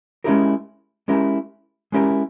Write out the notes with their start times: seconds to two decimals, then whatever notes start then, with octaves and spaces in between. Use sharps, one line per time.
0.24 G#3 C#4 E4 G4 A#4
1.08 G#3 C#4 E4 G4 A#4
1.92 G#3 C#4 E4 G4 A#4